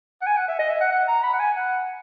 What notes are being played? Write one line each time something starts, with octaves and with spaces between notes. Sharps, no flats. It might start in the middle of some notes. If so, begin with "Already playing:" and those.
F#5
G#5
F#5
E5
D#5
E5
F#5
F#5
A#5
B5
F#5
G#5
F#5